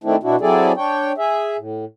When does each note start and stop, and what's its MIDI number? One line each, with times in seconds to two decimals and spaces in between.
0.04 0.16 51
0.04 0.16 57
0.04 0.16 60
0.04 0.16 62
0.04 0.16 64
0.23 0.36 47
0.23 0.36 62
0.23 0.36 64
0.23 0.36 66
0.41 0.72 54
0.41 0.72 60
0.41 0.72 64
0.41 0.72 68
0.41 0.72 69
0.41 0.72 74
0.77 1.12 62
0.77 1.12 73
0.77 1.12 79
1.18 1.57 68
1.18 1.57 76
1.58 1.85 45